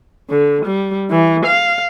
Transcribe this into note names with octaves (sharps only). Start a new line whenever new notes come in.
D3
G3
E3
F5